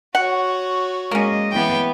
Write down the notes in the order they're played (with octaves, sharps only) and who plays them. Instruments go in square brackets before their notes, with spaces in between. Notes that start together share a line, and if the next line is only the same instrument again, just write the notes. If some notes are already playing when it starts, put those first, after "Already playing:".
[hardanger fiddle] F#4 C#5 [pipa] F#5
[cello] G#3 D#5 [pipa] A#3 C#4
[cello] E3 B3 [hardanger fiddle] G5